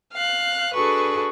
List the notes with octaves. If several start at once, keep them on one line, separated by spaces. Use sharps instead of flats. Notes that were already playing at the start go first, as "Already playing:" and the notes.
F5 F#6
D4 F#4 G#4 A4 B4 C#6